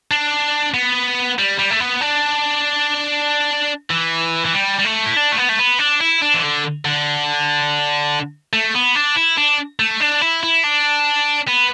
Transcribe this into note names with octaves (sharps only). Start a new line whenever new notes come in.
D4
B3
G3
G3
A3
B3
D4
E3
E3
G3
G3
A3
E4
D4
A3
B3
A3
B3
D4
E4
D4
E3
D3
D3
A3
B3
D4
E4
D4
A3
D4
E4
E4
D4
B3